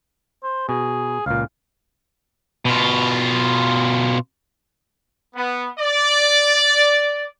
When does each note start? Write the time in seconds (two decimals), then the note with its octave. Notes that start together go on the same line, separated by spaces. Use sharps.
0.43 C5
0.69 B2 G#4
1.26 C#2 A#2 F5
2.65 B2 F4
5.34 B3
5.79 D5